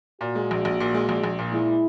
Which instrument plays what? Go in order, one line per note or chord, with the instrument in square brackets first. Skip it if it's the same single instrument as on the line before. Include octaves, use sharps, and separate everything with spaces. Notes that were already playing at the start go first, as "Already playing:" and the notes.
[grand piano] A#2 [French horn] F#4
[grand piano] G#3
A#1
A#1
A#2
G#3
A#1
A#1
A#2
[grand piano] G#3 [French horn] E4